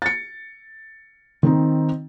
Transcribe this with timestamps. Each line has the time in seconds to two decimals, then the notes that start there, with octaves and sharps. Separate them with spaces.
0.02 A6 C#7
1.43 D#3 C4 D#4